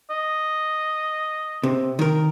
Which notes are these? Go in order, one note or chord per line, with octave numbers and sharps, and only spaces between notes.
D#5
C3
D#3 A#4